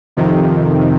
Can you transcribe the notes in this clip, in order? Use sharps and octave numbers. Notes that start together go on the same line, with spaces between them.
F2 C3 D#3